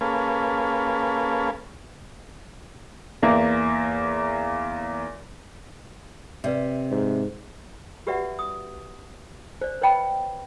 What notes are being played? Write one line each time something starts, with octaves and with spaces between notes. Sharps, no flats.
A#3 C#4 G#4 A4 B4 F5
E2 A#3 E5
C3 B4 D5 E5
G#2
F#4 G4 B4 D5 E5 F#5
D#6
C5 D5
B4 C#5 D#5 G5 B5